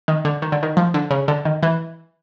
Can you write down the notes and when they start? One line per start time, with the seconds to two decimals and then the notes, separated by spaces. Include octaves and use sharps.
0.08 D#3
0.25 D3
0.42 D#3
0.52 D3
0.63 D#3
0.77 F3
0.94 D3
1.11 C#3
1.28 D3
1.45 D#3
1.63 E3